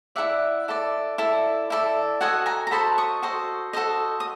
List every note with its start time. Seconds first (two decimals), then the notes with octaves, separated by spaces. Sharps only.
0.16 E4 A4 D5 E5 F#5
0.68 E4 A4 D5
1.18 E4 A4 D5
1.70 E4 A4 D5
2.21 F#4 A4 C5 D#5 F#5 G#5
2.46 G#5 A#5
2.67 A#5
2.71 F#4 A4 C5 D#5 A5 B5
2.98 C#6 D#6
3.22 F#4 A4 C5 D#5
3.73 F#4 A4 C5 D#5
4.20 D#6